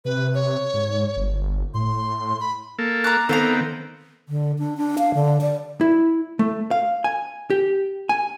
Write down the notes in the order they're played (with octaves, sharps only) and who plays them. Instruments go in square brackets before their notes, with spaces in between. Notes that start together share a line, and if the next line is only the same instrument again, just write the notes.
[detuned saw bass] C3 [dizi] B4
[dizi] C#5
[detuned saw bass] G#2
G1
[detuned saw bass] A2 [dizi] C6
[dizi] B5
[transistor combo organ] A#3 A4
[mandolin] A#5 D6 F#6
[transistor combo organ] D#3 B3 C4 [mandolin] A4 F5 A#5
[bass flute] D3
D4
D4
F5
D3
D5
[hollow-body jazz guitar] E4
A3
F5
G#5
G4
G#5